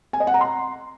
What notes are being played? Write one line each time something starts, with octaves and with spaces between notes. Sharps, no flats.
G#5
D#5
F#5
A#5
C6